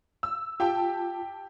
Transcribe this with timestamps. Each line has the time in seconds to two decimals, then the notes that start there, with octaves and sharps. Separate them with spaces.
0.23 E6
0.60 F4 G4 G5 A5